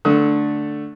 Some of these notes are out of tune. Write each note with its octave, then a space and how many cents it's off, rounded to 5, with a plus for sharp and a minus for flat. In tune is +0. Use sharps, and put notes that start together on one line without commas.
D3 +0 A3 +0 D#6 +45